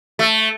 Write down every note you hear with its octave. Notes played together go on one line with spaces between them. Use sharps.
A3